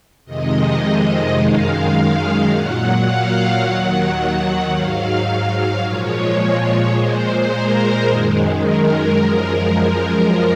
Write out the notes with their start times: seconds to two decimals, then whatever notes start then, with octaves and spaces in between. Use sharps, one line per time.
0.25 F2 C3 D#3 G#3 D#5
1.36 F#2 D#3 G#3 F5
1.92 F5
2.47 A#2 F#3 F#5
3.03 F5
3.58 D#2 D#3 F#3 F#5
4.70 G#2 F#3 F5
5.82 A#2 F3 G#3 C#5
6.92 A#2 G#3 C5
7.49 A#4
8.03 F#2 D#3 G#3
8.59 A#4
9.15 F#2 F3 G#3 A#4